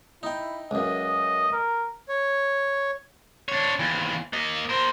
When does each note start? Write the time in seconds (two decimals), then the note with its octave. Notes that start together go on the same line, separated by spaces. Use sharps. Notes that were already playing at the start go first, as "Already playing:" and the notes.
0.23 D#4 E4 G5
0.71 C#2 F#2 D#5
1.53 A#4
2.08 C#5
3.49 D4 C#5
3.79 D#2 E3
4.33 A#3 D#5
4.69 A#4 C5